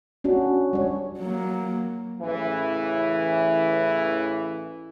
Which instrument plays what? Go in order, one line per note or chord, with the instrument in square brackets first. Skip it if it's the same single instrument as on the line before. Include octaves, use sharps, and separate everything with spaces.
[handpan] C#4 D4 F#4
G3 C#5
[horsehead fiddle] F#3 A#3
[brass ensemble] A1 C#3 E3